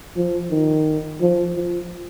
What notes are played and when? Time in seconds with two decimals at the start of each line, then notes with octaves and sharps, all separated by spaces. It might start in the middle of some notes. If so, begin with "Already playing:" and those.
0.17 F3
0.51 D#3
1.21 F3
1.56 F3